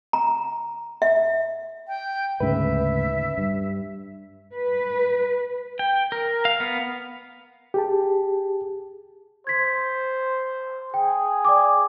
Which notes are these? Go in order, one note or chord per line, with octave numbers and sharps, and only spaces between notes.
A#5
E5
G5
D2 G#2 C#3 B4 E5
G2
B4
G5
A#4
F5
B3
G4 G#4 A5
C5 G#6 B6
G#4 G5
D5 G5 D6